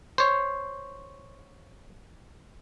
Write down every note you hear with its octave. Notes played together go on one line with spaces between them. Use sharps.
C5 C#5